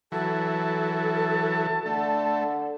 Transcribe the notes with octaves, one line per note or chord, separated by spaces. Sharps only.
E3 F#3 A4 A5
D3 A3